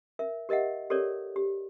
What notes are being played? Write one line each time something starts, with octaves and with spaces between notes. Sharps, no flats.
A#4 E5
G4 A#4 D#5 E5 F#5
G4 A4 A#4 C#5 D5
G4